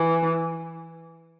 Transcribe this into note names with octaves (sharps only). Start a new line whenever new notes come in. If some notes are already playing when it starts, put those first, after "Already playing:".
Already playing: E3